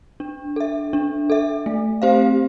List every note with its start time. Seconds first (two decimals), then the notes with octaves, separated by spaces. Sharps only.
0.20 D4
0.56 A4 E5
0.93 D4
1.30 A4 E5
1.66 A3
2.02 C4 G4 C5 F5